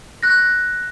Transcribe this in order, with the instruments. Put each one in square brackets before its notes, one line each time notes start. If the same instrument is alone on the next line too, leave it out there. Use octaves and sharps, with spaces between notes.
[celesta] F#6 A#6